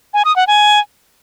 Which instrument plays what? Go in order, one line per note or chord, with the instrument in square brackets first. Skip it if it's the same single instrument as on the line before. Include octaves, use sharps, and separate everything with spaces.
[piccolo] G#5
D#6
F#5
G#5